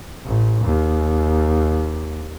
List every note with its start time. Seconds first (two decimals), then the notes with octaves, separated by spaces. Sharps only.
0.25 A1
0.65 D#2